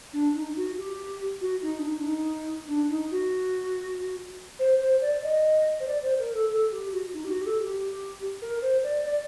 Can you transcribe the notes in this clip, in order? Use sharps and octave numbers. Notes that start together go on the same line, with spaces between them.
D4
D#4
F#4
G4
F#4
D#4
D4
D#4
D4
D#4
D4
D#4
F#4
C5
C5
D5
D#5
C5
D5
C5
A#4
A4
A4
G4
F#4
D#4
G4
F#4
G4
A4
G4
G4
A#4
C5
D5
D5